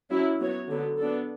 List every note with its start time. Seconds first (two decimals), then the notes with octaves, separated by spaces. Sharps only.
0.10 F#3 C#4 E4
0.40 F#3 B3 F#4 C#5
0.69 D3 F#3 B3
0.98 B3 D4 A4